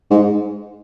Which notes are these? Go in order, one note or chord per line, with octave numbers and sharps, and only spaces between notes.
G#2